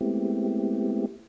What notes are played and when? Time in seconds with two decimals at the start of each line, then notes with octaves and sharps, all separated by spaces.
0.01 G#3 A3 B3 C4 E4 G4